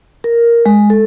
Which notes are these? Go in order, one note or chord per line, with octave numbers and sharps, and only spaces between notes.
A#4
G#3
A4